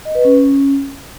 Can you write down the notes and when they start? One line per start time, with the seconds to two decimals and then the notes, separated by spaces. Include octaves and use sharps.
0.05 D#5
0.15 B4
0.25 C#4